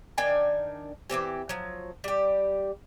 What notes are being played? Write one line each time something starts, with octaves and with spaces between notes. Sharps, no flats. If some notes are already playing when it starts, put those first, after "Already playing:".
D#3 D4 G5 G#5
E3 A#3 C4 G4
F3 F#3
G3 G4